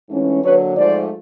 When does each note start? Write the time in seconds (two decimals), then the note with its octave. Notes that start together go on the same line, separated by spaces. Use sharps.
0.08 G#2 E3 A3 C#4
0.43 D3 F#3 A#3 B4 C#5
0.76 G#2 F3 A3 C5 D5